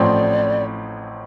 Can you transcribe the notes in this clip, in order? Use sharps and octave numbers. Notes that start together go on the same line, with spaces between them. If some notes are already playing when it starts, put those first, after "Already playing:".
Already playing: A1 A2 F3 C4 D5